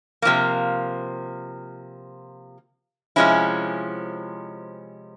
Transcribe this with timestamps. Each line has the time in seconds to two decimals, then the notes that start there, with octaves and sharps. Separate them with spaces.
0.22 C3 F3 A#3
3.16 C3 F3 G#3 C#4 E4